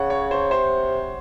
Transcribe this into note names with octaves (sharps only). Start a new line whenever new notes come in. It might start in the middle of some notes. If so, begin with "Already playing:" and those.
Already playing: C#3 F#5
C#5
C5
C3 C5